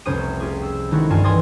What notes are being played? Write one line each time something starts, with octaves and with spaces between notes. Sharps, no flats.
F1 C2 C#4 C5 D#6 D#7
F4 G4 G#4
E6
D#3 G#3 D#4 E4 F#4 A4
G2 E3 F4 G#5 A5 F6
D#5 G#5 C6 D#6 G#6 A6